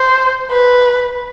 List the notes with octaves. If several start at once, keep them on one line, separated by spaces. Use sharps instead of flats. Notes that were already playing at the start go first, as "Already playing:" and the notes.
Already playing: C5
B4